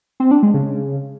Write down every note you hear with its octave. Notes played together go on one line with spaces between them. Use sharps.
C4
D4
G#3
C#3